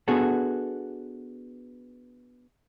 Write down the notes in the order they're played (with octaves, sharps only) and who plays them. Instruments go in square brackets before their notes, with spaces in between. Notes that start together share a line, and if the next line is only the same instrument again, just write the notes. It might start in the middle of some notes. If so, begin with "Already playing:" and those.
[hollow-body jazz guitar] B3 D4 F#4 G#4 A4